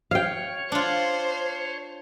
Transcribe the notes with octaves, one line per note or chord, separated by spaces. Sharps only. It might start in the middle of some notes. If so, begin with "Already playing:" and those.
C#5 F5 G5
D4 F4 C5